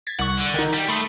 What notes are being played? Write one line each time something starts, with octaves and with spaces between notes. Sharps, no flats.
G#6 A6 B6
C2 F#5 C#6
D3
D#3 D#4
G3
A3 B5 C6 D#6